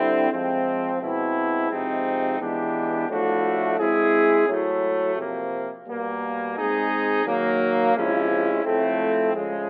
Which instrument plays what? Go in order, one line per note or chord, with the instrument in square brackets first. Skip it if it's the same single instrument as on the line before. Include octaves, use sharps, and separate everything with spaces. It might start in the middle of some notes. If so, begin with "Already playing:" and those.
Already playing: [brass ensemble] D3 G3 C4 E4
F3 G#3 C4
B2 G#3 C4 E4
C3 F3 G#3 C4 D#4
E3 G#3 B3 D4 G4
A2 F3 A3 D4 F#4
G#3 C4 E4 G#4
A2 F#3 A3
C3 F3 A#3
B2 G3 A#3
G#3 C4 D#4 G#4
D#3 F#3 A#3
C3 F3 G#3 C#4 E4
A2 F3 A3 C4
C#3 F3 G#3